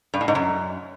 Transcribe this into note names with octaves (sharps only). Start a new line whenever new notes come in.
G2
A2
G#2
F#2